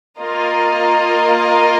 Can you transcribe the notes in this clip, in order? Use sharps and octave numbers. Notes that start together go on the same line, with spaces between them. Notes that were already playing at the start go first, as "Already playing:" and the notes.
A#3 F4 A#4 D#5